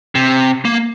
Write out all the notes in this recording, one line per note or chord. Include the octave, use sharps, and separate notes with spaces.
C3
A#3